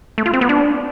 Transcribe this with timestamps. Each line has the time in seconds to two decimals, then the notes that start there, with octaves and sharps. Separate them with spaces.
0.18 A3
0.26 F4
0.33 C4
0.41 B3
0.49 D4